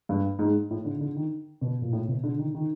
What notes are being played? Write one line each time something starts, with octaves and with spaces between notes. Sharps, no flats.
G2
G#2
A2
D3
D3
D#3
B2
A#2
A2
B2
D3
D#3
D#3